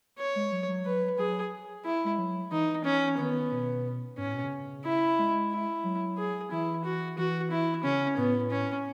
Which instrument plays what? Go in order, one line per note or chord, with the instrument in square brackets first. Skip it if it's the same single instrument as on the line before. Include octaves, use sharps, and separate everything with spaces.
[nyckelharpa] C#5
[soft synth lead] G#3
F#3
F#3
[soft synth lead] F#3 [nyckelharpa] B4
[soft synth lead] F#3 [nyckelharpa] G#4
[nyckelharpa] E4
[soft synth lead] G#3
F#3
[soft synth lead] E3 [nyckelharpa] D#4
[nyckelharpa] C#4
[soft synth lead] D#3 [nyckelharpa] B3
[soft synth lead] B2
[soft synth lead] G#2 [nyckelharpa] C#4
[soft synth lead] A2
B2
C#3
[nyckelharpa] E4
[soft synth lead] G#3
[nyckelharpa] E4
[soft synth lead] F#3
[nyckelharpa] G#4
[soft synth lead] E3 [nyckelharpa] E4
[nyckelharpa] F#4
[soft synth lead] E3 [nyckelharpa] F#4
[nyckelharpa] E4
[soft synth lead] C#3 [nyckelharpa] C#4
[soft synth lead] A2 [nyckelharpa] B3
[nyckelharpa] C#4